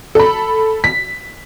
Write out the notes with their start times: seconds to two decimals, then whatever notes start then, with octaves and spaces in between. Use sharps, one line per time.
0.15 A4 B5
0.84 B6